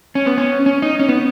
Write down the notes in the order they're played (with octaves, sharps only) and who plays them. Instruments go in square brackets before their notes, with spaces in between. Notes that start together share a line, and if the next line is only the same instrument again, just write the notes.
[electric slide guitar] C#4
B3
C#4
C#4
D#4
C#4
B3